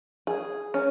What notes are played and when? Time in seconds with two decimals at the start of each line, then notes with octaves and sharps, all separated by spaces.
0.27 G#4
0.74 C#4